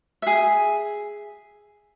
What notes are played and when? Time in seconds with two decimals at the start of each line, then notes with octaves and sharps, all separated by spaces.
0.22 G#4 E5